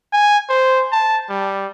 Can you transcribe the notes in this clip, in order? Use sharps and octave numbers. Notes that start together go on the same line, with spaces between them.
G#5
C5
A5
G3